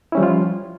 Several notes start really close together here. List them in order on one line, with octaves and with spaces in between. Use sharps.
E4 C#4 G3 F3 F4